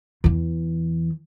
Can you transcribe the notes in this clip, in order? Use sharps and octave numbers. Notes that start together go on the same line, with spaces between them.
E2 E3